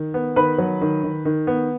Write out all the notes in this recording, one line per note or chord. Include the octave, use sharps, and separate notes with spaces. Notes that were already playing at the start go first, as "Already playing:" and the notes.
Already playing: D#3
B3
D#3 B4 B5
F#3
D#3
D#3
D#3
B3